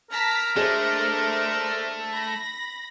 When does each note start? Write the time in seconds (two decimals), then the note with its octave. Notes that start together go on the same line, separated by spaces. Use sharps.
0.10 A#4 A5 A#5 B6
0.56 A3 D4 G#4 A4 C5 D#5
2.10 B5 A#6